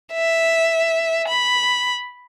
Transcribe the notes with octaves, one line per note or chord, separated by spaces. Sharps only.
E5
B5